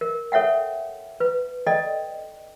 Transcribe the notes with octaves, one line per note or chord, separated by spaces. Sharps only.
A#4
A4 C#5 E5 F#5 G5
B4
A4 D5 D#5 G5